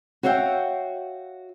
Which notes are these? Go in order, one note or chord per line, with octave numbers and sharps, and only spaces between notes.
F#4 C#5 E5 F5 G5